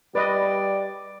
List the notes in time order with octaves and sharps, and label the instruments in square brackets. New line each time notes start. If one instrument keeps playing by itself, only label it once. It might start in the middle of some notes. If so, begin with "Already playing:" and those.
[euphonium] G3 [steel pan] B4 D#5 [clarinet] D5